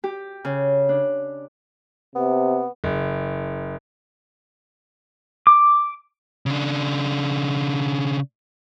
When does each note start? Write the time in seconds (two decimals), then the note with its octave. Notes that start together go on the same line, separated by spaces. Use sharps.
0.04 G4
0.45 C#3
0.89 D4
2.16 C3 B3
2.84 F#1
5.47 D6
6.46 C#3 D4